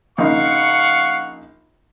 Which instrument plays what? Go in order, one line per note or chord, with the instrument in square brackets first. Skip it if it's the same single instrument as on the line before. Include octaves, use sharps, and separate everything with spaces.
[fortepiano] A#1 C#3 D#4 [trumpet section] F5 F#5 C#6